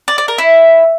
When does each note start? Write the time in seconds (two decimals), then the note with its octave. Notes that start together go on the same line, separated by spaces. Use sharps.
0.08 D5
0.18 D5
0.28 A#4
0.38 E4